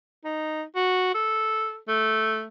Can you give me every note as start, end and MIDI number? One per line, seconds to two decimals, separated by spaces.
0.25 0.63 63
0.76 1.11 66
1.15 1.78 69
1.88 2.47 57